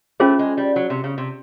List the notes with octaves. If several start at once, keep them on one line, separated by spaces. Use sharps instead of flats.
A3 C#4 F4 G#4 C5
G#3
G3
F#3
C3
C#3
C3